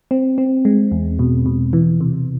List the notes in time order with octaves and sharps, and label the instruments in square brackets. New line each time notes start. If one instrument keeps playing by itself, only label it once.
[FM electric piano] C4
C4
G#3
E2
B2
B2
E3
C3